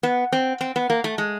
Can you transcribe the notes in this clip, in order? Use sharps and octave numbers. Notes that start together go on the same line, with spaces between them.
B3
C4
C4
B3
A#3
A3
G#3